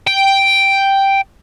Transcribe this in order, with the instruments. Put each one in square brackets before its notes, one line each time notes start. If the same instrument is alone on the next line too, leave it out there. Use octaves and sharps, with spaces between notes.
[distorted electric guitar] G5